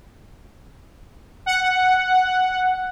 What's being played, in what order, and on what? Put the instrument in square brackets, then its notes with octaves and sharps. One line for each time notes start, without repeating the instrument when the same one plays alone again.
[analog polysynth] F#5